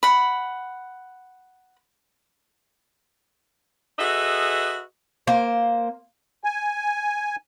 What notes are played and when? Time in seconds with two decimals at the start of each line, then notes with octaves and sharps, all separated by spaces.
0.03 F#5 B5
3.99 F#4 G#4 A4 B4 D#5 E5
5.27 A#3 C5
6.44 G#5